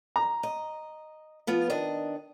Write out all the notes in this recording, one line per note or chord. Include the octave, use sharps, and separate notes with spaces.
A#5
D#5
F3 B3 F4
D#3 D4 D#5